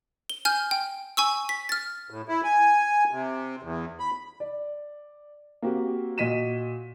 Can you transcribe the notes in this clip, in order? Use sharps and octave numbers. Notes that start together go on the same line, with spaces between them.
G7
G#5 F6 G6
G5
G#5 C#6 E6
B6
F6 A6
A2
E4
G#5
C3
E2
B5
D5
A#3 C4 F#4 G4 A#4
A#2 F#4 D#5 B6 D#7 E7